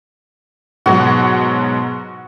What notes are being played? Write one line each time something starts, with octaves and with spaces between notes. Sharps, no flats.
G#2 B2 F#3 F#4